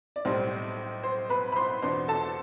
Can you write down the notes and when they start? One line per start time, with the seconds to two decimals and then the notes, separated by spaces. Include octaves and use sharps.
0.16 D5
0.25 B1 A2 G3 C4 C5
1.03 C5
1.30 B4 B5
1.52 B5
1.56 C5 C6
1.82 E2 B2 B3 D4 C5 C6
2.08 A4 A5